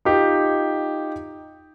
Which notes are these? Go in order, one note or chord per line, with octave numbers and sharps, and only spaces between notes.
D#4 F4 G4